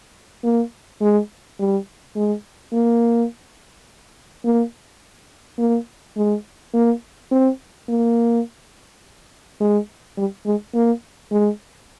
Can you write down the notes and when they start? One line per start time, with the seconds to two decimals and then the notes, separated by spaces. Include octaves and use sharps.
0.44 A#3
1.01 G#3
1.59 G3
2.16 G#3
2.73 A#3
4.45 A#3
5.59 A#3
6.17 G#3
6.74 A#3
7.31 C4
7.89 A#3
9.61 G#3
10.18 G3
10.46 G#3
10.74 A#3
11.32 G#3